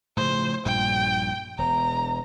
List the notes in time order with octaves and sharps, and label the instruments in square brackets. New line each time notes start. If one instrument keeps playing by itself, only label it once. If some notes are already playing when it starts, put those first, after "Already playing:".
[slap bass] A2 C#3 F3 [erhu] C5
[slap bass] A#1 G2 A#2 [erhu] G5
[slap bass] E1 [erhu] A#5